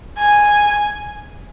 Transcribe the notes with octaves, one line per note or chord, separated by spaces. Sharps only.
G#5